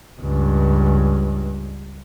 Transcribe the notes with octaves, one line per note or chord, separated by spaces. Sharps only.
C#2 G2